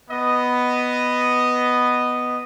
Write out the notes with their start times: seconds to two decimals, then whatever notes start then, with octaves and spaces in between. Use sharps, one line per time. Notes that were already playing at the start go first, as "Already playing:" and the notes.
0.11 B3 D#5